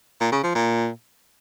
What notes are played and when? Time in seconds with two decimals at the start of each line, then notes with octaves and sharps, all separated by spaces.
0.21 A#2
0.32 C#3
0.44 F3
0.55 A#2